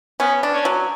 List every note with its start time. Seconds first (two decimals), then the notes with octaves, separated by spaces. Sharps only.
0.20 B3 C#4
0.43 D4
0.54 C#4
0.65 F#3